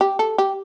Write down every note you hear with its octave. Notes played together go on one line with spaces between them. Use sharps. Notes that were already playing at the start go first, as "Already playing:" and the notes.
G4
A4
G4